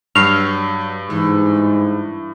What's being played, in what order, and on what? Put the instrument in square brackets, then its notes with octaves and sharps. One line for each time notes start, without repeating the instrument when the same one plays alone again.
[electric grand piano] G2 C#6 C7 [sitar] F#3 [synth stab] F6
[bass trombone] G#2 [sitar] E3